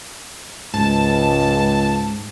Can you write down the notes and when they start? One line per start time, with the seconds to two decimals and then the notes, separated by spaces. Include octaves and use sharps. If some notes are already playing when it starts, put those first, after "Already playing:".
0.74 C#2 G#2 A5